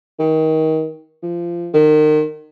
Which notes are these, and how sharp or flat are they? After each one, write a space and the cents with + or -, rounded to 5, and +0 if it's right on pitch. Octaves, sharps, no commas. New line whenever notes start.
D#3 +25
F3 -20
D#3 -30